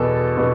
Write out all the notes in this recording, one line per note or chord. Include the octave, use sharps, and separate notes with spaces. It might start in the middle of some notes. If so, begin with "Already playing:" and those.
Already playing: E2 B2 B3 A4
B2 B3